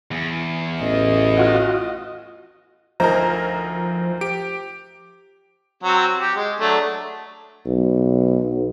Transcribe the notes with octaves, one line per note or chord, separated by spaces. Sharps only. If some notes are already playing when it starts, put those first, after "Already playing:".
E2
A1 D#5
F4 F#4
D2 F3 D#4 A#4 C5 A#5
G4 D7
F#3 C4 F#4
G4
G#3
F#3 A3 D4
B1